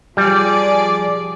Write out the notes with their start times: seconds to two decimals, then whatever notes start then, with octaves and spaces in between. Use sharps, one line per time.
0.17 F3 G3 G#4 D5